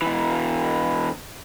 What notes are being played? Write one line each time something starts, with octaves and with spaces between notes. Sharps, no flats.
B2 E3